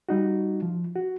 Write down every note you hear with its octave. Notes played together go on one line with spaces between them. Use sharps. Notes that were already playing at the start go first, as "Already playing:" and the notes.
G3 D#4 F#4
F3
F#4